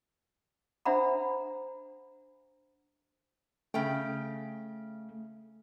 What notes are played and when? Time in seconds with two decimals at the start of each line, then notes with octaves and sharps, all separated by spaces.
0.85 D4 C5 E5 F#5 A#5 B5
3.74 C#3 A3 G5